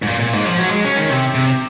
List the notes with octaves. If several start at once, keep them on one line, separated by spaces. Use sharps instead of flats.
G#2
A#2
A#2
G#2
F3
F#3
G#3
C#4
D#3
C3
C3